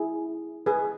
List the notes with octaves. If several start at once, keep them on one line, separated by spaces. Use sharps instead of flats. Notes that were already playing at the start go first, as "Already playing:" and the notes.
Already playing: E4 G#4
G#4 B4